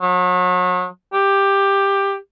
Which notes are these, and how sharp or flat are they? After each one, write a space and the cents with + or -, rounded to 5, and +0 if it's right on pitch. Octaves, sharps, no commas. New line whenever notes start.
F#3 -35
G4 +10